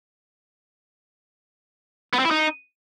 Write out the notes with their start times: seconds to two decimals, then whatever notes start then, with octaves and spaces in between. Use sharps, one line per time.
2.13 B3
2.19 C4
2.25 E4
2.31 D#4